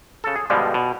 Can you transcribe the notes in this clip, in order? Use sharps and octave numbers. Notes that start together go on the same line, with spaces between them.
C#3 A4
G#4
G2 B2 D3 F3 G3 G#3
B2